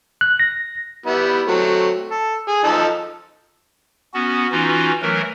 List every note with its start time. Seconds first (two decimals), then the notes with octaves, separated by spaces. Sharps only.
0.21 F#6
0.40 A#6
1.06 G3 B3 E4
1.48 F#3 A3 C4
2.11 A4
2.48 G#4
2.64 F3 D#4 A4
4.14 B3 C#4 F#4
4.52 E3 C#4 D#4 F4 F#4
5.02 E3 F#3 A3 A#4